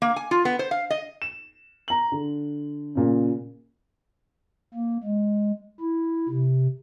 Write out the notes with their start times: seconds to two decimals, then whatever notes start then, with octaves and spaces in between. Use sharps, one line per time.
0.02 A#3
0.16 G#5
0.31 F4
0.45 B3
0.59 C5
0.71 F5
0.90 D#5
1.22 E7
1.88 A#5 F#7
2.12 D3
2.95 A#2 C#3
4.74 A#3
5.04 G#3
5.81 E4
6.29 C3